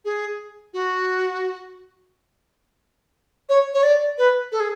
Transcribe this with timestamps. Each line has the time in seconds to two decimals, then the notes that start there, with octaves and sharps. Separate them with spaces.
0.04 G#4
0.73 F#4
3.49 C#5
3.73 C#5
3.83 D5
4.18 B4
4.52 A4
4.60 G#4